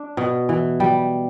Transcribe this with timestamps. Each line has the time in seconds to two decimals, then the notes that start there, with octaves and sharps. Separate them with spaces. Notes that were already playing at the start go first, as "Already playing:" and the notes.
Already playing: D4
0.17 B2
0.49 E3
0.80 G3